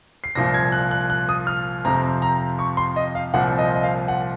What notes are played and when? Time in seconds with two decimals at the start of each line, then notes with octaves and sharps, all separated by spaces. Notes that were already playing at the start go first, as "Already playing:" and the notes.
0.24 C7
0.35 C2 A#2 F3 A#6
0.54 G#6
0.72 F#6
0.91 F#6
1.10 F#6
1.29 D#6
1.47 F6
1.85 F2 C3 F3 C4 A#5
2.22 A#5
2.59 C#6
2.77 C6
2.96 D#5
3.15 F5
3.34 C2 A#2 F3 C4 F#5
3.58 D#5
3.75 D#5
3.83 F5
4.08 F#5